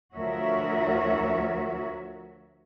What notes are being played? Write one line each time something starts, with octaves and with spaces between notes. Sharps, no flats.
D2 F3 F#4 A#4 C#5 E5